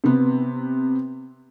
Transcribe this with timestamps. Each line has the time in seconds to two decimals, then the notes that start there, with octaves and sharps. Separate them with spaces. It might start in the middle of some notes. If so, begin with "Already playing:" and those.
0.04 C3 B3